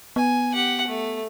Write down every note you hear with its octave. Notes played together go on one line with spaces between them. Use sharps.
B3 G#5
G4 F#5
A3